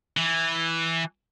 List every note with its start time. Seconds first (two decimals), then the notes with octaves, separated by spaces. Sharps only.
0.17 E3